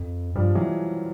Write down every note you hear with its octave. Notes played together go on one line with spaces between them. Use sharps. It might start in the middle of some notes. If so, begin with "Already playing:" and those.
Already playing: F2
G2 F3 G3
E3 F#3